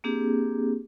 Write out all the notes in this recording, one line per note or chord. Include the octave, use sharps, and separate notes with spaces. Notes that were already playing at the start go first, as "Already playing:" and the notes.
A#3 C4 D4 G4 G#4